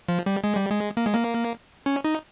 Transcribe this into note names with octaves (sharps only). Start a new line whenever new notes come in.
F3
G3
G#3
G3
G#3
A#3
G#3
A#3
C#4
D#4